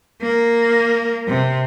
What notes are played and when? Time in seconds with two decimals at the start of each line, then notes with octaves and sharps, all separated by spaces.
0.22 A#3
1.28 C3